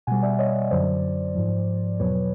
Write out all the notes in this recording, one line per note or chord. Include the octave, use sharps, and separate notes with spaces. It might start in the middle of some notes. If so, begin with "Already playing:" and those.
B2 G3 F#5 G#5
D5 E5
C#5 D#5
F#2 D3 F#3 C5 D5
G#2 F3
E2 B2 F#3 B4 C#5